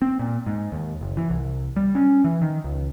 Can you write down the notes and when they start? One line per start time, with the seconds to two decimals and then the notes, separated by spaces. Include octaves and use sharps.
0.02 C4
0.19 A#2
0.46 G#2
0.72 D#2
1.01 F#1
1.17 E3
1.30 C2
1.76 G3
1.95 C#4
2.24 E3
2.42 D#3
2.64 C#2